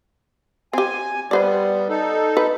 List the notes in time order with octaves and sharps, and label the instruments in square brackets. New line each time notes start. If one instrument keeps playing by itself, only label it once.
[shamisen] C4 G4 [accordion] G#5
[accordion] G3 B3 [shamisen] B4 C5 D5
[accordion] D#4 A4
[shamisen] B4